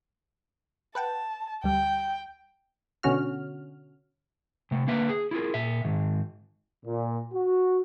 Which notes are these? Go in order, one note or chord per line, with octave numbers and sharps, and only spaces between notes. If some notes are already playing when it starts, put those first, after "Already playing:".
B4 F#5 G5 A5
D2 G3 G5
B2 D3 C#4 F#4 F6
C3 A3
D3 A#3 B4 E5
G#4
E4 F4 G#4 A#4
A#2 E5
G#2 D#3
A#2
F#4